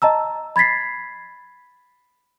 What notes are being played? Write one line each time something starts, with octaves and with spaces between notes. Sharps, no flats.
D#5 A5 A#5 E6
B5 G#6 A6 B6 C7